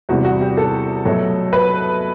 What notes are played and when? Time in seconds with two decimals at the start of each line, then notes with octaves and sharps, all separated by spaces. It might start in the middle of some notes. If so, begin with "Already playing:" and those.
0.09 E2 C3 G3 F#4
0.25 F#4
0.41 G4
0.57 A4
1.05 B2 F#3 A3
1.53 B4